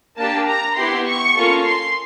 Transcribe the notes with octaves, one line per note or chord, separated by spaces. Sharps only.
A#3 D4 G4 A5
A#5
B3 E4 G4 C6
C#6
A#3 C#4 F4 A4
C6